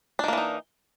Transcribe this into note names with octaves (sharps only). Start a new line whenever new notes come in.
D#3 E3 A#3 D4 D#4